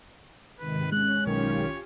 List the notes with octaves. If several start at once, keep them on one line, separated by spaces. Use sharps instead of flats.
G#2 C3 D#3 B4
G#3 C#4 F#6
B1 D#3 C#4 F4 G4 C#5